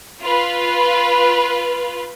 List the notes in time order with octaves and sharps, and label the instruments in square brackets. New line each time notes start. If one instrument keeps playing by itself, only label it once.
[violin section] F4 B4